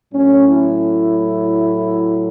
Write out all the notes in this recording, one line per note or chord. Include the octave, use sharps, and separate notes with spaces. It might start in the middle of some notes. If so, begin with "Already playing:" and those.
A2 F#3 A3 C#4
E4